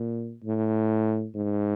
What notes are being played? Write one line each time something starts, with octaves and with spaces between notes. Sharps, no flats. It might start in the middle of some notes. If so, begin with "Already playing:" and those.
Already playing: A#2
A2
G#2